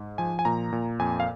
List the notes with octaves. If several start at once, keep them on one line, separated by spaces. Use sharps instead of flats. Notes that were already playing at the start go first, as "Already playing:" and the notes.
Already playing: G#2
F3 G#5
G#5
A#2 A#5
A#2
F2 G#5
F5